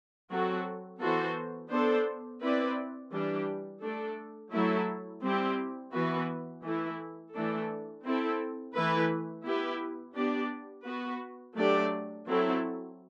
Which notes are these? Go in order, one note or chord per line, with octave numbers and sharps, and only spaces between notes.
F#3 C4 F#4 A4
E3 B3 F#4 A4 C5
B3 D4 A4 C5
C4 E4 B4 D5
E3 G3 D4 G4
A3 D4 A4
F#3 A3 E4 A4
G3 C4 E4 G4
E3 B3 F#4 B4
E3 A3 E4
E3 A3 D4 A4
C4 E4 A4
E3 A3 E4 B4
B3 E4 G4 B4
B3 D4 G4 D5
B3 F#4 B4
F#3 A3 D4 G4 D5
F#3 C4 E4 A4